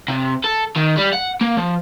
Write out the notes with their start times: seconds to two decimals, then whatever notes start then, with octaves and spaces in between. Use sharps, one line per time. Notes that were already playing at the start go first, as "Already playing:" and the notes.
0.08 C3
0.44 A4
0.76 D#3
0.97 G3
1.13 F#5
1.41 A#3
1.57 F3